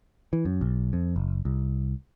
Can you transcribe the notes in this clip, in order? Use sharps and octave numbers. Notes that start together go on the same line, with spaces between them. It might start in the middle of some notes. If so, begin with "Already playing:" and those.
E3
F#2
B1
F2
F#1
C2